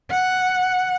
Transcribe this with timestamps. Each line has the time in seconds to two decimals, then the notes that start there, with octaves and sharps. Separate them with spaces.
0.11 F#5